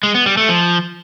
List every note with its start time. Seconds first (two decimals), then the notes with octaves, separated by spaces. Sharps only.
0.03 G#3
0.15 B3
0.26 G3
0.37 A3
0.49 F3